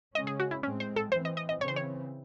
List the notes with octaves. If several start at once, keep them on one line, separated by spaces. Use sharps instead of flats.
C#3 G#3 C#4 D#5
G#4
F#4
E4
A2 G#3 C4 C#4
C5
A4
E3 C4 C5
D#5
D#5
D#5
C#3 E3 C4 C#5
C5
C#5